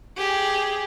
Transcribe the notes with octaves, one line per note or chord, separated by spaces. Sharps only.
G4 G#4